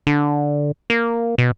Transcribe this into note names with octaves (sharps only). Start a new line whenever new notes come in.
D3
A#3
B2